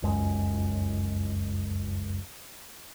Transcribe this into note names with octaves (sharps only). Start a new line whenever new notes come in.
F1 C#2 F#2 G#3